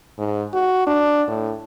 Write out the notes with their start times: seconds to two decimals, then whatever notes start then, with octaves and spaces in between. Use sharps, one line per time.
0.19 G#2
0.53 F#4
0.87 D4
1.28 A2